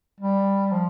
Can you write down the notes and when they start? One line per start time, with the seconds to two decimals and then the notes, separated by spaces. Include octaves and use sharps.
0.21 G3
0.72 F3